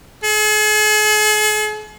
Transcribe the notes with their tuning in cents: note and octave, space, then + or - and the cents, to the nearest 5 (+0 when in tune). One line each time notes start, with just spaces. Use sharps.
G#4 +45